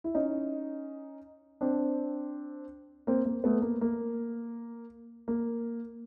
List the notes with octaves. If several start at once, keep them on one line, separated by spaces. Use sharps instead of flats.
E4
C#4 D#4
C4 D4
A#3 C4
A#3
A3 B3
A#3
A#3
A#3